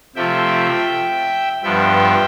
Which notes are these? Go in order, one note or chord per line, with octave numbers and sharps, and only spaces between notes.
C3 F3 A3 E5 G5
G2 F3 B3 E5 G5